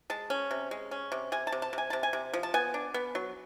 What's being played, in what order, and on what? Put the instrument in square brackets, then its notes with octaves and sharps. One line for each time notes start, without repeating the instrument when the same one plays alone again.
[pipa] G#3 A5
C#4
C3
G#3
C#4
C3
C3 G#5
A5
C3
A5
C3 G#5
C3 A5
G#5
C3
F3
A5
B3 G#5
D4
B3
F#3